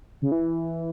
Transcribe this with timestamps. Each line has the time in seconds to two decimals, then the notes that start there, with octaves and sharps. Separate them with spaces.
0.22 C#3
0.32 E3